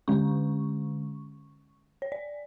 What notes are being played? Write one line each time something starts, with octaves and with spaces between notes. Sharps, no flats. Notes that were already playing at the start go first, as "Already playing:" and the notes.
D3 G#3 C#4 C#6
C#5
D5